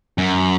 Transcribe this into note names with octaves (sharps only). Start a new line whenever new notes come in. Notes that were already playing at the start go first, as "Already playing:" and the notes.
F#2